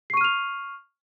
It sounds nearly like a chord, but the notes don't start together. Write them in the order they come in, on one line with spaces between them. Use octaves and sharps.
C7 C#6 D#7 F6 F7